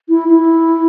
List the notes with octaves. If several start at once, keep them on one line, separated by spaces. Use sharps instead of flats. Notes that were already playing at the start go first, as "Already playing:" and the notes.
E4
E4